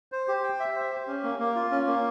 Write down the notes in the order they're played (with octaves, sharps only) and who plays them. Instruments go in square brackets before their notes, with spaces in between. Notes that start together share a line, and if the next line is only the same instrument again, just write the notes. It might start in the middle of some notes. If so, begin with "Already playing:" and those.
[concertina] C5
G4
G5
E5
C5
G4
C#4
A#3
A#3
F4
C#4
A#3